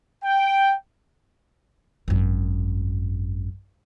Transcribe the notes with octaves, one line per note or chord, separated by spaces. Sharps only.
G5
G#1 F#2